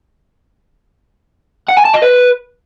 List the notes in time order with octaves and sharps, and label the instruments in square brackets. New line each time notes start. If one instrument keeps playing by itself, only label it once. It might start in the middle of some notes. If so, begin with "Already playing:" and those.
[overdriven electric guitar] F#5
G#5
A5
D#5
B4